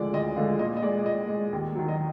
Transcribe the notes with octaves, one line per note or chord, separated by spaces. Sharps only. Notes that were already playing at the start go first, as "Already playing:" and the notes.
Already playing: D2 D3 F3 G#3 D5
D2 D#5
D3 F3 G#3 F5
A#2 D#5
D#5
G#3 D5
A#2 D#5
G#3
D#2
D#3 F#3
D#5